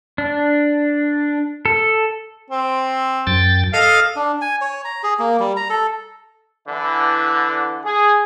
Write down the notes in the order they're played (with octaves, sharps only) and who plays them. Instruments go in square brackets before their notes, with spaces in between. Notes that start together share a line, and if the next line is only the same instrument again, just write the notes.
[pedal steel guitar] D4
A4
[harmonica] C4
[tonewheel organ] F#2 G5 A6
[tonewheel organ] A4 D#5 [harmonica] F5
[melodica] D4
G#5
C#5
A#5
G#4
A#3
G3
A#5
A4
[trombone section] D3 E3
G#4